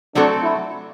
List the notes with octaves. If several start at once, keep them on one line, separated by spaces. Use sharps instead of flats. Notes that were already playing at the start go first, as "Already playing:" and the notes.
F#3 A3 C4 D4 F#4 A4
E4